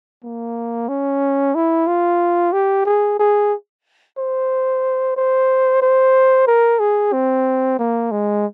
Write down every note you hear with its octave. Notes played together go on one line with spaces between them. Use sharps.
A#3
C#4
E4
F4
G4
G#4
G#4
C5
C5
C5
A#4
G#4
C4
A#3
G#3